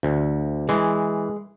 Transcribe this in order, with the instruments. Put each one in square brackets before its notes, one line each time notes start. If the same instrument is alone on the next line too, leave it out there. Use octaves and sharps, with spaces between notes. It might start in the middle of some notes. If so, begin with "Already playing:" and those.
[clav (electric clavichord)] D2
[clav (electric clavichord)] E3 [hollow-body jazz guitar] G#3